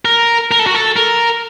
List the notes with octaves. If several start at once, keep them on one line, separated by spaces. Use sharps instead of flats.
A#4
A#4
A4
F#4
A4
A#4